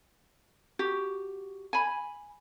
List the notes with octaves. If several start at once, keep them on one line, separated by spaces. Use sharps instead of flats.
F#4 G4
G#5 B5